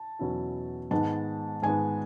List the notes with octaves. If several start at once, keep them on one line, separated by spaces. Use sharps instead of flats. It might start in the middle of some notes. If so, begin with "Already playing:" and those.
Already playing: A5
E2 B2 F#3 C#4 E4
G#2 D#3 G#3 B3 A5
G#2 D#3 G#3 B3 G#5